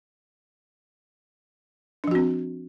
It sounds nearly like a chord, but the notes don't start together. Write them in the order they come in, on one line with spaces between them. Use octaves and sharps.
D4 F3 F#4 C4